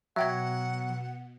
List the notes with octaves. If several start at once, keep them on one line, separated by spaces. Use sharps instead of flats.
B2 F#3 E5 F#5 G5 G#6